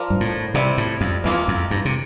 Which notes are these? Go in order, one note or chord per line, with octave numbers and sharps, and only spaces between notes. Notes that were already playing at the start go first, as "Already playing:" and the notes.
Already playing: F3 F4 A#4 D5
G2
A2
C3 G3 C4 E4
A2
F2
E2 E3 A#3 F4
F2
G2
C3